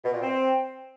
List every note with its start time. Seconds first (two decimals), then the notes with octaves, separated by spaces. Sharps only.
0.04 B2
0.13 A#2
0.21 C4